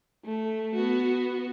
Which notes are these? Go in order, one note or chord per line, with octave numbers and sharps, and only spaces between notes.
A3
B3 F#4